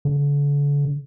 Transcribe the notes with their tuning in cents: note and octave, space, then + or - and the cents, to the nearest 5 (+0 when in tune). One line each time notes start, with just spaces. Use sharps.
D3 -40